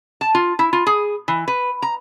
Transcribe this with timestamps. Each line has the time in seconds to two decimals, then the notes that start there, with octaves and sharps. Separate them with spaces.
0.21 A5
0.35 F4
0.59 E4
0.73 F4
0.87 G#4
1.28 E3
1.48 B4
1.82 A#5